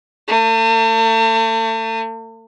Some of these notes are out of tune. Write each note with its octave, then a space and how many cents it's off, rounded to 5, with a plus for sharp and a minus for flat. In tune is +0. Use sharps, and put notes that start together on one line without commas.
A3 +40